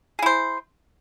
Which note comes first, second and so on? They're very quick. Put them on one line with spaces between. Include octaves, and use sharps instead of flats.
G#4 E4 C5